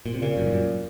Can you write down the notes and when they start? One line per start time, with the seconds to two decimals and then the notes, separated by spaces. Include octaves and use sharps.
0.06 A#2
0.14 C3
0.21 A#2 C#3
0.37 F#2
0.46 G#2
0.52 F#2